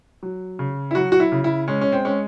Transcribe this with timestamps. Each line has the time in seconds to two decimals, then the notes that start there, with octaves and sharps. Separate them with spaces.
0.23 F#3
0.59 C#3
0.91 E4
0.95 F#3 F#4
1.12 F#4
1.20 E4
1.32 C#3
1.44 E4
1.68 G#3 C#4
1.81 C#4
1.92 C4
2.05 G#3 C#4